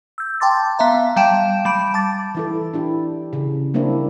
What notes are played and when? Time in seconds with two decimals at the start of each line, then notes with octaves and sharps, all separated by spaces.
0.18 E6 G6
0.40 G5 A5 C6 D6 A6
0.79 B3 E5 F5 A#5
1.16 G3 F5 G5 A5 D7 E7
1.65 G3 B5 D7
1.94 A5 D6 A6
2.35 E3 E4 A4
2.74 D4 E4 G4
3.33 C#3
3.74 G3 A#3 C4 D4 E4